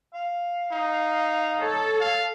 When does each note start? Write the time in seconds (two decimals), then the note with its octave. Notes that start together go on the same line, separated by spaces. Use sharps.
0.14 F5
0.72 D#4
1.61 A4 C#5
2.00 F5